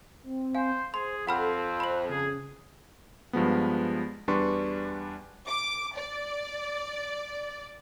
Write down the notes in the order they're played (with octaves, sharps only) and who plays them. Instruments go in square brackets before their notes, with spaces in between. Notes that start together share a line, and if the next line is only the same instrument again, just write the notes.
[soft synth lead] C4
[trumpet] C5 [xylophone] F5 G#5
[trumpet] G#4 [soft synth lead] C5 [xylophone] C6
[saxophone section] F2 [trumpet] C4 [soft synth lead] A4 [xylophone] F#5 B5 F6
[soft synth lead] C5 [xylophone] B5 F#7
[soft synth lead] C#3 [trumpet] G#4
[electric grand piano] G2 F3 G#3 B3
E2 G3 D4 B4 C6 C#6
[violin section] D6
D5